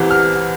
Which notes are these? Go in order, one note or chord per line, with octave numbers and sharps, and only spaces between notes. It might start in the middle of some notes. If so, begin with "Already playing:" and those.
Already playing: C2 C3 E3
F6